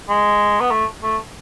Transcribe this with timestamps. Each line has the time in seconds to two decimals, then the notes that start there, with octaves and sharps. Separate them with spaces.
0.09 G#3
0.61 B3
0.71 A3
1.03 A3